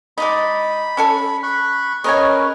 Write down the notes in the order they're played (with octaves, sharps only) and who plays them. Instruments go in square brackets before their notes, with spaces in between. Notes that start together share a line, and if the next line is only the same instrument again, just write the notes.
[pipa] G#3 D#4 [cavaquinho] D5 D#5 [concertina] B5
[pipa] C#4 A4 G#5
[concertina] B5 C#6 F#6
[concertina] C#4 B4 [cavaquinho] A#4 C#5 G#5 [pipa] D#5